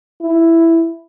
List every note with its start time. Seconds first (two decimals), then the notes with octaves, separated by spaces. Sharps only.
0.22 E4